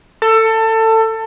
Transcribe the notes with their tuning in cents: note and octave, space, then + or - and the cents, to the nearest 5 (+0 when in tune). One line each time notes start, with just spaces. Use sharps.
A4 +20